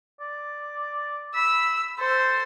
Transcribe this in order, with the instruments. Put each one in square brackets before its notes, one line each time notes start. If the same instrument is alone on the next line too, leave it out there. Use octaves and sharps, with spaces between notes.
[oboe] D5
[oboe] B5 [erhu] E6
[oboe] A4 [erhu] C5